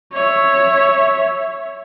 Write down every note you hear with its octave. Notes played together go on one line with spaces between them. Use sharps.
C#5 E5